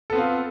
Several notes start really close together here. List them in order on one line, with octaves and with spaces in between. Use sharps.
A4 B3 C4 F4